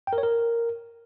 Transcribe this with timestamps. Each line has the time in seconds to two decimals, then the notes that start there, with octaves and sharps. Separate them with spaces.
0.07 G5
0.13 A#4
0.18 C#5
0.23 A#4